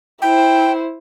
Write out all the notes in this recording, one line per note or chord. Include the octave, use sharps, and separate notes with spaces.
E4 C5 G5